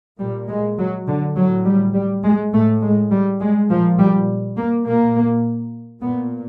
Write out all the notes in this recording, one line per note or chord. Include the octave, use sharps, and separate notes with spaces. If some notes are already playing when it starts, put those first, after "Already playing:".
A#2 G3
G#3
F#3
D3
A2 F#3
G3
G3
G#3
A2 A3
G#3
G3
G#3
A#2 F3
G3
A#3
A#2 A#3
A#2 B3